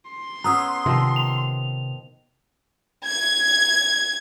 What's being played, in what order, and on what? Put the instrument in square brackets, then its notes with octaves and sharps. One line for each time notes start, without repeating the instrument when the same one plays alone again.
[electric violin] C6
[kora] B3 C#4 G#4 [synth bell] A#5 D#6 E6
[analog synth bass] C3 [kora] D#3 F3
[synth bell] F7
[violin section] G#6